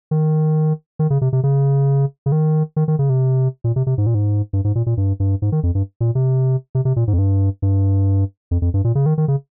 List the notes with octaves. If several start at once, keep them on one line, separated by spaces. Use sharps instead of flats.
D#3
D#3
C#3
C3
C3
C#3
C#3
D#3
D#3
D#3
C#3
C3
A#2
C3
C3
G#2
A#2
G#2
G2
G#2
A#2
A#2
G2
G2
G#2
D#3
F2
G2
A#2
C3
C3
C3
A#2
G#2
F2
G2
G2
F2
F2
G2
A#2
C#3
D#3
D#3
C#3